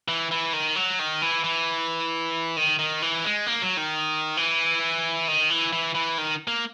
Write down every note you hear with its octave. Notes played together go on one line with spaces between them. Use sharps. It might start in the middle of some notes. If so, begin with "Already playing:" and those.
E3
E3
D#3
F#3
D#3
E3
E3
D#3
D#3
E3
G#3
A#3
F#3
D#3
E3
D#3
E3
E3
E3
D#3
A#3